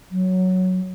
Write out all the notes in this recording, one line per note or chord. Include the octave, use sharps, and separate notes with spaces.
F#3